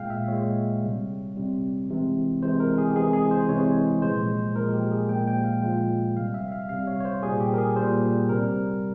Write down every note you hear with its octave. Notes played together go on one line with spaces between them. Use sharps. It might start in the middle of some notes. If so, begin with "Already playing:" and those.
Already playing: A#2 G#3 F5 G5
E5
A#2 G#3 C#5
C3 G3
C3 G3
C3 E3 G#3
C3 E3 G#3 C5
A#4
G#4
G4
C3 E3 G#3 G#4
G#4
C5
C3 E3 G#3 C#5
A#2 F3 G#3 C5
A#2 F3 G#3 A#4
G4
G#4
A#2 F3 G#3 G5
G5
F5
A#2 F3 G#3 G5
C3 G3 F5
E5
F5
C3 G3 F5
C#5
C#5
C5
A#2 G3 G#4
G4
A#4
G#4
A#2 G3 C5
C3 G3 A#4